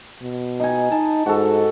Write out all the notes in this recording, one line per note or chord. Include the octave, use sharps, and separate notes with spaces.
B2
D#4 G#5
D#4 A5
G#2 F#4 A4